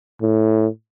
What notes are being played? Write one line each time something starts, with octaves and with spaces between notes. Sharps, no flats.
A2